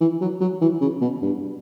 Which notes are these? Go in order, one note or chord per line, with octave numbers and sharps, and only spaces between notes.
E3
F#3
F#3
E3
C#3
B2
G2